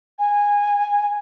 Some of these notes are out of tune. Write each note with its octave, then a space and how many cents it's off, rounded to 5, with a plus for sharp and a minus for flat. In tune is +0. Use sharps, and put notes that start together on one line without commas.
G#5 -15